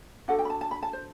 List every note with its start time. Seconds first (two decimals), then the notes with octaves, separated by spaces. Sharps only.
0.28 D4 F#4 A4 F#5
0.39 G5
0.45 B5
0.50 A5
0.61 A5
0.71 B5
0.83 A5
0.93 C5